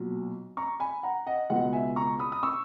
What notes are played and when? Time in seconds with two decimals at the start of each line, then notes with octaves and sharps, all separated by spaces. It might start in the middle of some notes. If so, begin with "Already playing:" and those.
Already playing: B1 A#2 F#3
0.57 A#5 C#6
0.80 G#5 B5
1.03 F#5 A#5
1.26 D#5 F#5
1.50 C#2 B2 G#3 D#5 F#5
1.73 E5 G#5
1.96 A#5 C#6
2.19 B5 D#6
2.32 D#6
2.43 C#6 E6